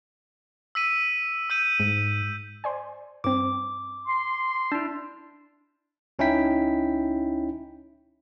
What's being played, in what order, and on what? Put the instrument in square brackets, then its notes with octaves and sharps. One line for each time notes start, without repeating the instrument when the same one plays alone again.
[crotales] E6 B6 D#7
E6 G6 D#7
[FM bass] G#2
[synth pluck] C5 D5 G#5
[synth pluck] G2 C4 [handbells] D6
[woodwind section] C6
[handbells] D4 E4 [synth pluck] A5
[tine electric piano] C#2 C#4 D#4 E4 G5 B6